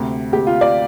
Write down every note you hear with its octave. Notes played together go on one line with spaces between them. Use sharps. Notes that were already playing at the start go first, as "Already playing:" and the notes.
Already playing: D2 C3
D2 C3 G4
F4
D5